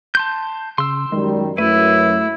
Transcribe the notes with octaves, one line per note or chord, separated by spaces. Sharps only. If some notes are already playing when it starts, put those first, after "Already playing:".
A5 C6 G6
C#3 C6 E6
F#2 D#3 G3 G#3
F#2 A3 E4 B4